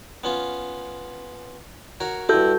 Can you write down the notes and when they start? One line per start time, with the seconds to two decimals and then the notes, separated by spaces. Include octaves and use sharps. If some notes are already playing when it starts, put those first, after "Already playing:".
0.24 B3 C#4 F4
2.00 F#4 A#4 C#5
2.29 G2 E4 F#4 A4 G6